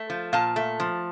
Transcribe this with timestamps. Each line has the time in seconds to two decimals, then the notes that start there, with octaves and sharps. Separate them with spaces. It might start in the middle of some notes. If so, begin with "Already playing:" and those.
Already playing: A3
0.10 F3
0.33 A#2 F5 A5
0.56 A3
0.80 F3